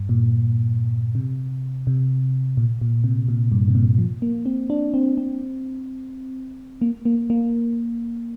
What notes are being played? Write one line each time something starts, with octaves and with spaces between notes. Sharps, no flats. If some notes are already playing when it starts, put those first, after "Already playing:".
Already playing: G2
A#2
C3
C3
A#2
A#2
C3
A#2
G2
C3
A#2
F3
A#3
C4
D4
C4
C4
A#3
A#3
A#3